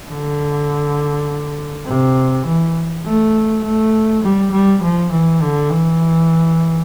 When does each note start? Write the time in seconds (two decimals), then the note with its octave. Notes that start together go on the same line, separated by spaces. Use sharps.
0.09 D3
1.86 C3
2.46 E3
3.05 A3
3.63 A3
4.23 G3
4.52 G3
4.82 F3
5.12 E3
5.42 D3
5.70 E3